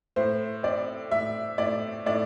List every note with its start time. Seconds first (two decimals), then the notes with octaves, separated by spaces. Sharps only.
0.16 A2 C5
0.63 C4 D5
1.11 A2 E5
1.58 A2 D5
2.06 A2 D5